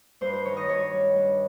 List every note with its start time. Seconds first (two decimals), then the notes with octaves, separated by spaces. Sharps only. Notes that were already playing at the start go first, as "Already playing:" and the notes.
0.21 G2 C5
0.33 C5
0.45 D#3 C#5
0.57 D#5
0.69 G2 C#5
0.93 G3
1.16 G2